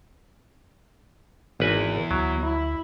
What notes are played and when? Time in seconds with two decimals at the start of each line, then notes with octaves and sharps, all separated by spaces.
1.60 G#1 E2 B4 G#5
2.11 D2 F#3
2.41 E4